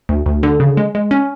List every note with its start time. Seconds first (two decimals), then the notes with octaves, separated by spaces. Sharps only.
0.09 D2
0.26 D2
0.43 D3
0.60 C#3
0.77 G#3
0.95 G#3
1.11 C#4